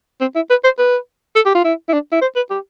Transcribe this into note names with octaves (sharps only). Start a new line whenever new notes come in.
C4
E4
B4
C5
B4
A4
G4
F4
E4
E4
D4
E4
C5
B4
G4